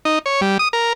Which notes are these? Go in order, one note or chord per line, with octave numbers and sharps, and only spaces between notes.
D#4
C#5
G3
D#6
A#4